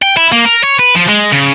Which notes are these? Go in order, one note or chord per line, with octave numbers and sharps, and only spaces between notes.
G5
E4
A#3
A#4
C#5
B4
F3
G#3
C#3